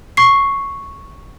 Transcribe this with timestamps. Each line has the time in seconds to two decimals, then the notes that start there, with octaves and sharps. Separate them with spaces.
0.17 C#6 C7